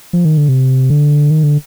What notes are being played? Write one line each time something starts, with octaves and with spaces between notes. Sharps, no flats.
F3
D#3
D3
C3
D3
D#3
D3